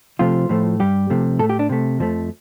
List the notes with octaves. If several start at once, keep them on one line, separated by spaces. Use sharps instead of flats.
C3 F3 A3 F4
A2 F3 A3
G2 G3 G4
C3 F3 A3
A2 A3 A4
G4
D4
C3 A3
F2 F3 A3